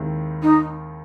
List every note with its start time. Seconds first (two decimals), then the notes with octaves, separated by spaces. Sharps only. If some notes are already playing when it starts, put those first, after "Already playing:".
Already playing: D#2 D#3 G#3 C4 E4
0.43 D#4